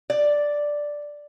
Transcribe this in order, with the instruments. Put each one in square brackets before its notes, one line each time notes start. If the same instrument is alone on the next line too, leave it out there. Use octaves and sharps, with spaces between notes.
[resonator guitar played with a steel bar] D5